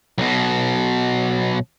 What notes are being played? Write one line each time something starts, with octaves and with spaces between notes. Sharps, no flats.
B1 B2